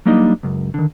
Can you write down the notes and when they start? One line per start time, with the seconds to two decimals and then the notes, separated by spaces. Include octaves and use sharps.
0.06 F#3 G3 A#3 D4 D#4 D#5
0.43 C#2 F#2
0.74 D3 D#3